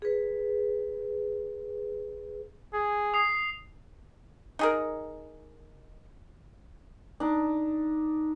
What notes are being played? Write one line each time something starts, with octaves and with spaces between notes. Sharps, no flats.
G#4 B4
G#4
D#6 C7
D#4 G#4 A#4
D4 D#4